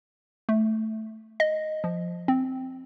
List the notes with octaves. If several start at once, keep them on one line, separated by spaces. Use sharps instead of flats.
A3
D#5
F3
C4